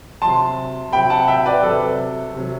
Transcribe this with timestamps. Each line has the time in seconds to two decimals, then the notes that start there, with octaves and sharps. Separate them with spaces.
0.22 C3 F#3 A5 C6
0.93 C3 F#3 G5 B5
1.10 F#5 A5
1.28 E5 G5
1.46 B4 D5
1.63 C3 F#3 A4
2.35 C3 F#3